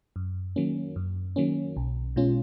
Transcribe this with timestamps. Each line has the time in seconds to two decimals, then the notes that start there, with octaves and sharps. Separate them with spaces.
0.16 F#2
0.56 D#3 F#3 A#3 C#4
0.96 F#2
1.36 D#3 F#3 A#3 C#4
1.77 B1
2.16 B2 G#3 C#4 F4